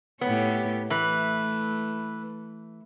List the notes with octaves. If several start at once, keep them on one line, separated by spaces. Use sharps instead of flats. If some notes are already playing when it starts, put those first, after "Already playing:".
A2 B3 G4 C#5
E3 A3 B4